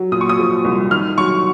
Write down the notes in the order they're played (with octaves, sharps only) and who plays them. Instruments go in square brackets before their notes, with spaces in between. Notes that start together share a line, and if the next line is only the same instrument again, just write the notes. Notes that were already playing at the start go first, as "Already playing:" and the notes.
Already playing: [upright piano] F#3
A#2 D#6
C#6
D#6
F3
C2
D#3 F6
F#3 C#6